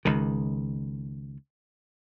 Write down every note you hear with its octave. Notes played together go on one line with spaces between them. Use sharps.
C#2 D#3